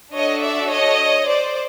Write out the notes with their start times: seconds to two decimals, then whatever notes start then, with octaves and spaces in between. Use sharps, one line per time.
0.13 D4 F#4 A4 C#5 D#5
0.41 D5 E5
0.70 C#5 D#5
1.28 C5 D5